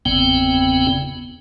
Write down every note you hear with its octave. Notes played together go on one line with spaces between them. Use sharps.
G1 E2 C#3 B3 C4 G5